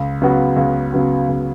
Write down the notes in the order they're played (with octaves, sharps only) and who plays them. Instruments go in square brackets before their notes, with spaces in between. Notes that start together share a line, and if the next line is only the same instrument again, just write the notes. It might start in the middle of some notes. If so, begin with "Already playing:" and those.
Already playing: [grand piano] C#2
C#3 F#3 B3 F#4
C#2
C#3 F#3 B3 F#4
C#2